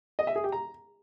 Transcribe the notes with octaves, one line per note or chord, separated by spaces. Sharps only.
D#5
E5
G#4
G4
A#5